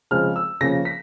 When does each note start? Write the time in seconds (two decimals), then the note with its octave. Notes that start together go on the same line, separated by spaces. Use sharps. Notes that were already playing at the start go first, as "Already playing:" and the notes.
0.11 C#3 F3 G#3 C4 F6
0.36 E6
0.61 C#3 F3 A#3 C#4 A#6
0.85 B6